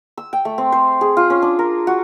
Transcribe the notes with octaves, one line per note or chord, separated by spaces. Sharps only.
E6
G5
A3
C4
C5
G#4
F4
C#4
D4
A#4
F#4